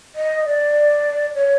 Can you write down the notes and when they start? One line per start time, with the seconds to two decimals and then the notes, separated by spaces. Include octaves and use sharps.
0.15 D#5
0.45 D5
1.35 C#5